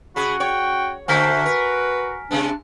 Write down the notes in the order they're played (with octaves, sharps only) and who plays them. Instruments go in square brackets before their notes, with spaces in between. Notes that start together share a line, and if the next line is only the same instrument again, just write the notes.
[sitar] C#3 G#4 [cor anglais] F#4 [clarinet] B5
[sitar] C#5 [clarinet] G5
[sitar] D3 A3 A#3 [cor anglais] F#4 [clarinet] C5 [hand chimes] G#5 F6 B6
[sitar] A#4 [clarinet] B4
[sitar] C3 G#3 B3 [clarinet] D4